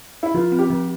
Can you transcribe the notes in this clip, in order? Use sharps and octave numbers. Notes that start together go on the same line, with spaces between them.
E4
F3 F4
C4
G4
F3